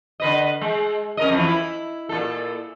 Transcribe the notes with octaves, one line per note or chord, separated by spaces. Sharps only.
D3 B4 D#5
G#3
C#4 A#4 D#5
F2 E3
E4
A#2 A4